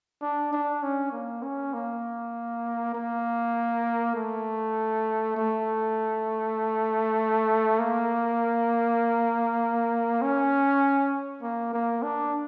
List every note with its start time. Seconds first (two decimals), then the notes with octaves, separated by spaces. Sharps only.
0.22 D4
0.52 D4
0.83 C#4
1.12 A#3
1.43 C#4
1.74 A#3
2.95 A#3
4.15 A3
5.37 A3
7.79 A#3
10.21 C#4
11.42 A#3
11.73 A#3
12.02 D4